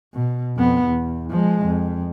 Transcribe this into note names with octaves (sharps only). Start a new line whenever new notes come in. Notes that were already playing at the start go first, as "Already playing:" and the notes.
B2
F2 B3
E2
F3 G#3
F2